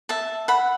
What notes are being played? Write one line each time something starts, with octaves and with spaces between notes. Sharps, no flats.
E5 A5
F#5 B5